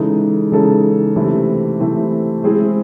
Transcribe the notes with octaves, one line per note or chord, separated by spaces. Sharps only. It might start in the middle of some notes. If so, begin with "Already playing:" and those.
Already playing: C#3 E3 G#3 D#4 A4
C#3 E3 G#3 D#4 A4
C3 E3 A3 C4 E4
C3 E3 A3 C4 E4
G#3 C4 E4 G#4